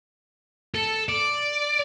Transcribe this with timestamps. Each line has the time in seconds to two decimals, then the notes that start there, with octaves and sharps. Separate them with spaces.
0.75 A4
1.09 D5